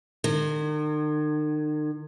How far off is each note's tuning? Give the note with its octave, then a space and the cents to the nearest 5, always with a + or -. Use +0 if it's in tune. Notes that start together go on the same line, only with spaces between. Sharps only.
D#3 -45